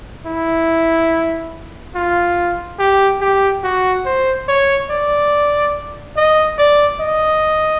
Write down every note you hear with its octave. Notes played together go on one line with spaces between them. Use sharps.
E4
F4
G4
G4
F#4
C5
C#5
D5
D#5
D5
D#5